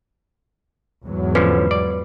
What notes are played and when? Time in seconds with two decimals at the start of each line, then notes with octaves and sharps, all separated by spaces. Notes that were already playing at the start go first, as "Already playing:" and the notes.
1.04 E2 G#2 F#3
1.35 D3 F3 C#4 B4
1.71 D5